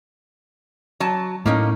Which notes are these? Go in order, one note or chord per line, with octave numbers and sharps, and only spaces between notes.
F#3 A5
A2 A#3 C#4 D#4